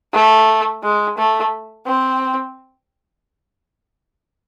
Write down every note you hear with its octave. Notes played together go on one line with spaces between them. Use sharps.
A3
G#3
A3
C4